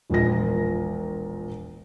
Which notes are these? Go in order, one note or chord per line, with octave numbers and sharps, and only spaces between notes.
E1 A#1 A#2 A#6